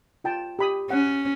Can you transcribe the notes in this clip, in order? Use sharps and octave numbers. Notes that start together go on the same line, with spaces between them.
F4 G5 A5
G4 B5 D#6
C#4 F#5